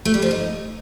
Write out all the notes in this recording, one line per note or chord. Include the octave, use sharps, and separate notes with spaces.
A3
G3
F3
D#4